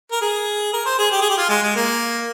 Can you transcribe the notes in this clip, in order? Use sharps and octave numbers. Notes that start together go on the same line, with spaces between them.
A#4
G#4
A#4
C5
G#4
G4
G#4
G4
F4
G#3
G#3
A#3